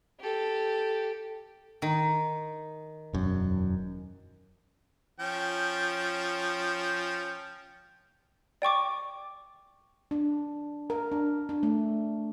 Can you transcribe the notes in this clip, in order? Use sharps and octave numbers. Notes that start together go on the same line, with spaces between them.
G4 A4
D#3
E1 F#2
F3 C#4 G5
D5 G5 C#6 D6
D4
A#4
D4
D4
A3